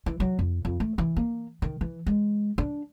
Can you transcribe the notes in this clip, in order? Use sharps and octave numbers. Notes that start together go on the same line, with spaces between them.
E3
F#3
F2
F2
A3
E3
A#3
D#3
E3
G#3
D4